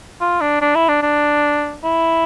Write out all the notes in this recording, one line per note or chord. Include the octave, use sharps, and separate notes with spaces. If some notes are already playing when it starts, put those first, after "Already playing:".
F4
D4
D4
E4
D4
D4
E4